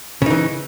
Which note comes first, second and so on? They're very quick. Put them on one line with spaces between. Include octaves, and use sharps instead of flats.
C#3 D#4 E3